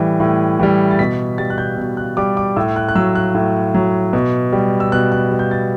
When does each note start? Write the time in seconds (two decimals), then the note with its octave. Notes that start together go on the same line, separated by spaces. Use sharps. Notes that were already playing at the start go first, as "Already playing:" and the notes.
Already playing: A2 E3 G3
0.20 A2
0.60 E3 G3
0.91 A6
0.99 B2 B6
1.38 G3 A6
1.50 F#6
1.58 G6
1.77 B2
1.97 F#6
2.17 G3 D6
2.37 D6
2.56 A2 E6
2.76 F#6
2.88 F#6
2.95 F#3 E6
3.15 F#6
3.34 A2
3.74 F#3
4.13 B2
4.52 G3
4.80 E6
4.92 B2 F#6
5.12 F#6
5.32 G3
5.39 G6
5.51 A6